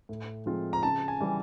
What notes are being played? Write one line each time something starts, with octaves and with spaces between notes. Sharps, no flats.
A2
F3 G#3 C4 F4
A#5
C#3 A5
G#5
E3 G3